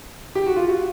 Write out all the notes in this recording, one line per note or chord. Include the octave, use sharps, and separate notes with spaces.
G4
F#4
F4
F#4